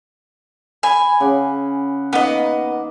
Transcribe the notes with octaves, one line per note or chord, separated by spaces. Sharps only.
G#5 B5
C#3 F#5 D6
D#3 A#3 B3 D#5 F5